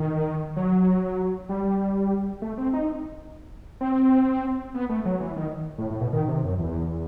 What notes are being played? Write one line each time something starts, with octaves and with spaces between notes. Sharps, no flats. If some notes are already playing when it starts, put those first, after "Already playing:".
Already playing: D#3
F#3
G3
A3
C4
D#4
C4
B3
A3
F#3
E3
D#3
A2
A2
B2
D#3
C3
F#2
E2